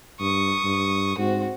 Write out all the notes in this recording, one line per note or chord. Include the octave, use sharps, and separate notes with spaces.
G2 C#6 D#6
G2
G#2 C4 F#4